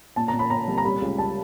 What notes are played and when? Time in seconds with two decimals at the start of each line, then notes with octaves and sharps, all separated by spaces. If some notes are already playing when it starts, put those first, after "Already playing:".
0.16 A#2 A5
0.28 A#5
0.33 A#2
0.39 B5
0.50 A#2 A#5
0.68 C2
0.78 A#5
0.85 G3 B5
1.02 C#2
1.18 G3 A5